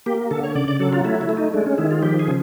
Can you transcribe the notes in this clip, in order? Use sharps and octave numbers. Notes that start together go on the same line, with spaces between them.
A#3 G4
D3 A4
C#5
C#3 D5
D5
F#3 A4
F4
A3 E4
E4
A3
D#4
G#3 D4
C#4
D#3 E4
F4
F3 G4
G#4
C#3